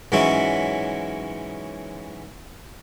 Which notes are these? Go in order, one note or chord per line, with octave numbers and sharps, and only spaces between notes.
G#2 E3 F#3 C#4 E4